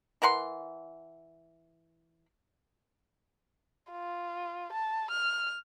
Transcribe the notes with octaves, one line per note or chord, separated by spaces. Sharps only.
E3 A#4 F#5 C6
F4
A5
F6